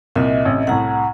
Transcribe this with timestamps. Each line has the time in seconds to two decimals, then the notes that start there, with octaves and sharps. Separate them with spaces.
0.16 C2 A#2 D#5 E5
0.45 A1 C3
0.67 C2 A2 F#5 A#5